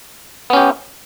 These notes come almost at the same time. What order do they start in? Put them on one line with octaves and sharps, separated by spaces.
B3 C#4 G4